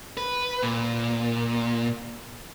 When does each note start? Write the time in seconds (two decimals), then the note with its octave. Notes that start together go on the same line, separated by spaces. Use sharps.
0.17 B4
0.63 A#2